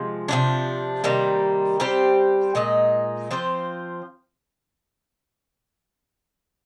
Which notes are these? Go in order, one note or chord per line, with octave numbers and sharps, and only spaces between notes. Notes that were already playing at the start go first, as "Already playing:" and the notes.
Already playing: C3 F3 G#3
C3 F3 G#3 D4
C3 D#3 G3 A#3
G3 C4 G4 C5
A#2 G#3 D#4
F3 C4 F4 C5